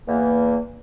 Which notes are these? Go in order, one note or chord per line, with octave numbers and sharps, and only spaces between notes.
E2 A#3